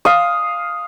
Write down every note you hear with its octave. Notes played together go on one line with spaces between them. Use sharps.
F5 D#6